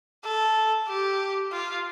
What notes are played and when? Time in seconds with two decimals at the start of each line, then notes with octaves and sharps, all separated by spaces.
0.24 A4
0.88 G4
1.52 F4